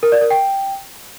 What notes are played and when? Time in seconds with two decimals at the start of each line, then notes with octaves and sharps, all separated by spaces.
0.03 A#4
0.12 D5
0.21 A#4
0.31 G5